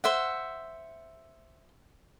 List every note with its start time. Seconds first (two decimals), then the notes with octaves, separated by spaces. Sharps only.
0.04 C5 E5 F#5